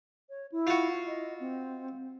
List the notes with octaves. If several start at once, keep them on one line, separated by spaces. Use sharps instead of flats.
C#5
E4
F4 F#4
D#5
C4